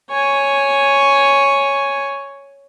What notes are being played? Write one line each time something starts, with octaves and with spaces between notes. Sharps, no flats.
C#5 G#5